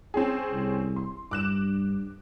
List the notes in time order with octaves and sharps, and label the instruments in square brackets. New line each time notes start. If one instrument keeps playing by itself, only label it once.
[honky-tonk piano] C4 C#4 G#4
[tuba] C2
[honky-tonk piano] C6
[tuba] G2 [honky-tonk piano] D6 F#6 E7